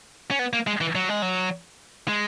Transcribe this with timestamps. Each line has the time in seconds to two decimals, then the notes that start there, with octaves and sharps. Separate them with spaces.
0.31 C#4
0.39 B3
0.53 A#3
0.67 G#3
0.81 E3
0.95 F#3
1.09 G#3
1.22 F#3
2.08 G#3